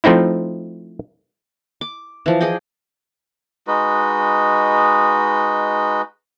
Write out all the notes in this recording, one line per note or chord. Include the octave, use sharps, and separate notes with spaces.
F3 A3 C4 D#4 E4
D6
E3 F3
G#4 D5 D#5 G5
G#3 D#4 F#4 B4